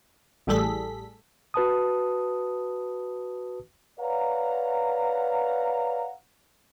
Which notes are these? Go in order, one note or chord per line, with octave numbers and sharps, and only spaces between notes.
A1 A2 G3 G#4 A4 B6
F#4 B4 A5 D#6
B4 C#5 D5 F5 F#5 A#5